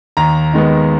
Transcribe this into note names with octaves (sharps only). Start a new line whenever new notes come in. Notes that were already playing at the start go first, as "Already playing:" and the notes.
D#2 A#5
D#3 G#3 B3